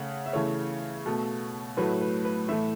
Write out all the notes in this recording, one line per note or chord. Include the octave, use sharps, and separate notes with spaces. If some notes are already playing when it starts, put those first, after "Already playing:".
Already playing: C#3 A3 F#5
E5
C#3 E3 A3 C#5
B2 A3
A2 F#3 A3 B4
B4
B4
A2 E3 A3 E5